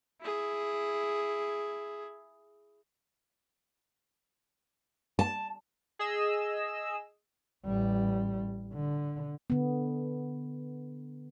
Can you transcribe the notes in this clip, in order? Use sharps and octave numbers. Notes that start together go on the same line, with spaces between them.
E4 G#4
A5
G#4 D#5 E6
A1 G3
D3
D3 B3